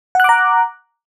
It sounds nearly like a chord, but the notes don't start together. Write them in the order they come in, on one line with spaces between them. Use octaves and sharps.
F#5 F#6 D6 A#5